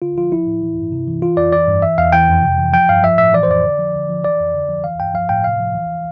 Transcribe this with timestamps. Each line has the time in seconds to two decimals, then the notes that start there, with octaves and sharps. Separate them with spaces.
0.02 D3 F4
0.18 F3 F4
0.32 F3 E4
0.47 A2
0.62 E3
0.78 G2
0.92 C3
1.07 E3
1.22 E3 F4
1.37 F2 D5
1.52 E3 D5
1.68 G2
1.82 E3 E5
1.98 E2 F5
2.12 E3 G5
2.29 F2
2.43 C3
2.58 E3
2.73 F3 G5
2.89 G2 F5
3.03 F3 E5
3.18 A2 E5
3.33 E3 D5
3.43 C5
3.48 F2 D5
3.64 D3
3.79 F3
3.94 D3
4.09 F3
4.24 E3 D5
4.40 F2
4.55 D3
4.69 F3
4.84 E3 F5
5.00 G2 G5
5.14 F3 F5
5.29 A2 G5
5.44 C3 F5
5.59 F3
5.75 E3